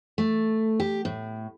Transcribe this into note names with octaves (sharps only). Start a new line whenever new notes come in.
A3
G4
A2